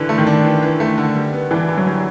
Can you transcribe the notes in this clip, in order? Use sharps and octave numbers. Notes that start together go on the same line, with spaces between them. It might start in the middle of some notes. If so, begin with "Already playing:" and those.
Already playing: D3 E3
A3
D#3
D4
E3
E3
A3
D3
G3
B3
E3 D4
D3
F#3
G3